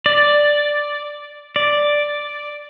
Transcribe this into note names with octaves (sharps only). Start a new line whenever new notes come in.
D5
D5